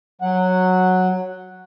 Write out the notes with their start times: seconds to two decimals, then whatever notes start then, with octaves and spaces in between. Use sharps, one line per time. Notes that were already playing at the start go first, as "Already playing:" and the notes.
0.21 F#3 F#5